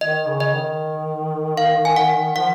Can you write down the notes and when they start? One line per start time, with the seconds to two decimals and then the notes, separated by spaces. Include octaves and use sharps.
0.01 D#3 D#5
0.27 C#3
0.40 D#5
0.54 D#3
1.57 F5
1.85 G#5
1.96 F#5
2.36 F3 F#5